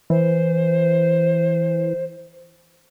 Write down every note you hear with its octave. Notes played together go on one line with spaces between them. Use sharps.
E3 C5